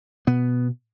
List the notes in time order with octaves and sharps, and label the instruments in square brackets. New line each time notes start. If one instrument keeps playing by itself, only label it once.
[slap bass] B2 B3